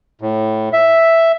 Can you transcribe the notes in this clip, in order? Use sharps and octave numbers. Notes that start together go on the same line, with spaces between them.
A2
E5